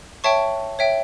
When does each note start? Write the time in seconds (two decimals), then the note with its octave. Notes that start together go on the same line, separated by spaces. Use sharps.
0.24 C#5 E5 G5 A5 C#6
0.79 C#5 E5 G5